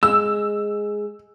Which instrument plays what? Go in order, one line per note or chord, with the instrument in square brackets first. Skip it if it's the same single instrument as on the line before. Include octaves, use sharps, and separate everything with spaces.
[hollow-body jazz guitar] G#3 [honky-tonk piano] E6